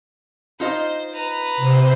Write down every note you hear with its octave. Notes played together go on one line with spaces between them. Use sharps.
D#4 F4 C5 D#5
B4 A#5
C3 C5